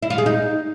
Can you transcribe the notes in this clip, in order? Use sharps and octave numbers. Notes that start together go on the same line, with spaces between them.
E4
F4
G#4
D#4